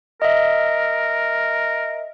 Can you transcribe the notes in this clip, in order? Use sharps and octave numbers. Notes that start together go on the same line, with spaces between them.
A#4 D#5 E5